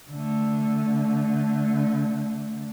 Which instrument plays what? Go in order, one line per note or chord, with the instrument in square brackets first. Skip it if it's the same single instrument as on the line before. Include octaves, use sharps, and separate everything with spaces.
[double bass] D3 A3